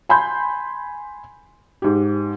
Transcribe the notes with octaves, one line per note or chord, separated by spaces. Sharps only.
G#5 B5 C6 G6
G#2 G4